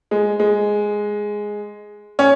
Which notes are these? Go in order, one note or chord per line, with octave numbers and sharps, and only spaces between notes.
G#3
G#3
C#4